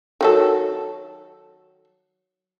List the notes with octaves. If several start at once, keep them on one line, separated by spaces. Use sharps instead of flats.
D#3 F#3 A4